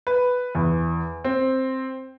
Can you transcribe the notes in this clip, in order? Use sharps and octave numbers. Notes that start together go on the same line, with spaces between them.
B4
E2
C4